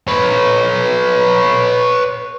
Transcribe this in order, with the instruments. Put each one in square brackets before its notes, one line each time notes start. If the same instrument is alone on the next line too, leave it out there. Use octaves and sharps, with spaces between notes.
[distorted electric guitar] B4 C#5